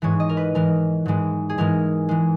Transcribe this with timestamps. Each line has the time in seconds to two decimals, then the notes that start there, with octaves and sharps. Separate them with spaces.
0.02 G#2 E3 G#3 C#5
0.20 D#5
0.29 A#4
0.37 B4
0.55 G#2 E3 G#3 A#4
1.06 G#2 E3 G#3
1.50 G#4
1.58 G#2 E3 G#3 A#4
2.09 E3 G#3